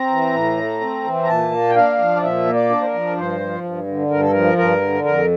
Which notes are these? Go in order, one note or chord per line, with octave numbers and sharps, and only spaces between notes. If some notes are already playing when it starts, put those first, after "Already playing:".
Already playing: C4 A#5
E3
A2
A3
C4
E3
A#5
A#2 A5
A#3
G5
D4 F5
F3
D5
A#2 E5
A#3
D5
D4
C5
A#4
F3
G2 C5
F3
G2
D3
G2 A#4
A4
F3 A#4
G2 A#4
D3
F2 A#4